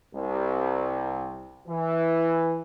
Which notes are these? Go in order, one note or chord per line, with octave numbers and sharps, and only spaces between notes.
C2
E3